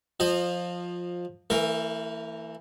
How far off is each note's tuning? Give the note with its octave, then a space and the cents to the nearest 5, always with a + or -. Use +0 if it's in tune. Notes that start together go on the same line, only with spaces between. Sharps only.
F3 +15 D#5 -25
E3 +0 A3 +45 A#4 +0